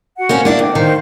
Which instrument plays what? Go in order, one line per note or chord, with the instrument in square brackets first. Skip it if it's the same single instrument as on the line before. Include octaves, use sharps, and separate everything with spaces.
[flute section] F#4 F#5
[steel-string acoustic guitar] A#3 C4 C#4
A#3 D4 E4
[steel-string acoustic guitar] D2 [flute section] G5 D6
[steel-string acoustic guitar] D#3 [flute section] A#4 C5 F5